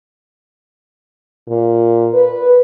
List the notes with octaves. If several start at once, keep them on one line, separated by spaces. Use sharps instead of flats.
A#2
B4